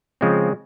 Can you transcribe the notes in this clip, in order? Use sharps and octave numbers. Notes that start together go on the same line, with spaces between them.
C#3 F3 G#3 C4